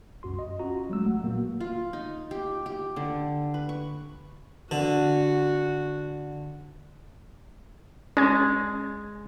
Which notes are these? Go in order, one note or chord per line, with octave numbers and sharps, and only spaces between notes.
C2 F#2 F#4 C6
D#5
C#4 F4 F#4 A#5
F#3 G#3 A3 E6
A1 F#5
A#2 F#3 A#3 B3 F#4
F4
D#4
G4
G4
D3
B4
C#6
D3 F#4
G#3 C#4 G#6